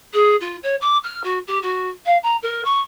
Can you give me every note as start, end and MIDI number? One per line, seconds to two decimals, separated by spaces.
0.13 0.35 68
0.40 0.56 65
0.62 0.75 73
0.81 0.97 86
1.03 1.20 89
1.23 1.38 66
1.47 1.58 67
1.62 1.88 66
2.05 2.17 77
2.22 2.36 82
2.42 2.61 70
2.64 2.79 85